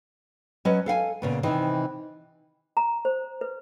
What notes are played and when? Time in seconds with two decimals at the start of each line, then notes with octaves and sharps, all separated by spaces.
0.65 F#3 C#4 B4 D#5
0.86 A4 F5 F#5 G#5
1.22 A#2 C#3 B3
1.43 C3 D#3 E3 C4 D#5
2.77 A#5
3.05 C5
3.41 B4